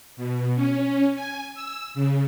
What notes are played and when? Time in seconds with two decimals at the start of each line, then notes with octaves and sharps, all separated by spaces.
0.17 B2
0.56 C#4
1.15 G#5
1.55 E6
1.94 C#3